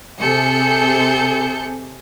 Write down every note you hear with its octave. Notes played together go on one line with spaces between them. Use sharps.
C3 G#4 A4 G6 C#7